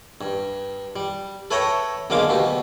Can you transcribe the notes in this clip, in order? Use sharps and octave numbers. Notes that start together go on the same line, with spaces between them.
G2
G3
A4 B4 C#5 E5 G5 A#5
B1 D3 G#3 A#3 F5 D6
D2 B2 G4